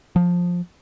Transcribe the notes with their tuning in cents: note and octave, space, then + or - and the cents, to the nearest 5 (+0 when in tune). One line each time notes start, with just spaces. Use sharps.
F3 +15